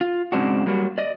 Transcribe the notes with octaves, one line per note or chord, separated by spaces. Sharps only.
F4
G#2 C#3 G#3 C4 D4 F#4
F#3 G3 A#3 F#4
D5 D#5